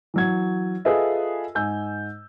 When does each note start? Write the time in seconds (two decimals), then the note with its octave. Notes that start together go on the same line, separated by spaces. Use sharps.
0.14 E3 F#3 G#6
0.85 F4 G#4 A4 B4 D#5 E5
1.55 G#2 G#5 E6 G6